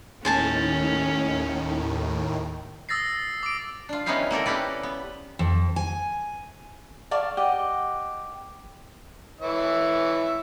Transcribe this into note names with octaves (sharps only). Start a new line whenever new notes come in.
D#2 A2 D#3 C#4 C5 G#5 A5
D#6 E6 A6 A#6 C7
D6 D7
D4 F4
B3 C#4 D#4 E4 G4 F5
A#3 C4 A4 A#4
C#4 G4 A4 B4 D5
B3
F2
G#5
D5 F5 A5 C#6
G4 D#5 F#5
E3 C#5 E5